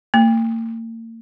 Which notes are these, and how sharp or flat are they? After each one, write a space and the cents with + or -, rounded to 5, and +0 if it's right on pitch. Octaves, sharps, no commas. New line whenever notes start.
A#3 -40